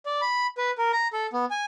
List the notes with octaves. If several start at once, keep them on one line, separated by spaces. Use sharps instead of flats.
D5
B5
B4
A#4
A#5
A4
B3
G#5